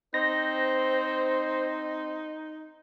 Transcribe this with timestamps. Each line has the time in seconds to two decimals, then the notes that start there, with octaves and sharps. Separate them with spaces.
0.14 C4 D#4 C5 A#6